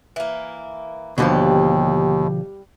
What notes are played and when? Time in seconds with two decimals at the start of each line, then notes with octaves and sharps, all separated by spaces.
0.16 E3 A#3
1.18 D#2 B2 D3 F3 G3 G4 B4